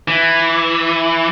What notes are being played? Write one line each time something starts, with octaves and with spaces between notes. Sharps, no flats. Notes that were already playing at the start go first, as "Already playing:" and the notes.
E3